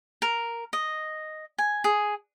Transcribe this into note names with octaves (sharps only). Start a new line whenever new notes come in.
A#4
D#5
G#5
G#4